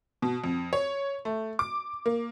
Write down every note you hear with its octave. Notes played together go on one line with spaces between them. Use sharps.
B2
F2
C#5
A3
D6
A#3